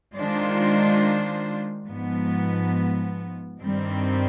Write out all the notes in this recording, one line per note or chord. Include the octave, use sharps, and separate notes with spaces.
D#3 G#3 D4 F4 C5
G#2 F3 B3
G2 D#3 G3 C4